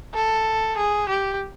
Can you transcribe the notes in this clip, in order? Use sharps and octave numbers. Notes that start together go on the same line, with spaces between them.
A4
G#4
G4